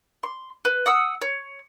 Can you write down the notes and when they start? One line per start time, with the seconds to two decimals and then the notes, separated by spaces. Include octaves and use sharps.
0.23 C6
0.65 B4
0.86 F#5 D#6 E6
1.21 C#5